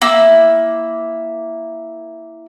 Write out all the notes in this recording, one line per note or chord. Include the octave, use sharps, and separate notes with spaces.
A#3 E4